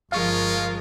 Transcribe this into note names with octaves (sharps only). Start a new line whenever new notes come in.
G1 F3 G#3 F4 A#4 F5 C#6